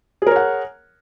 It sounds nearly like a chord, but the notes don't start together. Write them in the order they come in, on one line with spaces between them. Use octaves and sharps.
G#4 A#4 C#5 F#5